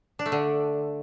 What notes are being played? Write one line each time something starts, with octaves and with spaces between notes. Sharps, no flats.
D4
A3
D3